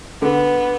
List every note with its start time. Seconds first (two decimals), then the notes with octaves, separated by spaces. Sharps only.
0.22 D3 B3